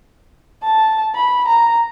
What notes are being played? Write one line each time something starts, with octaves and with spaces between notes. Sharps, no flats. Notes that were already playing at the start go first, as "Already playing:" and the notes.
A5
B5
A#5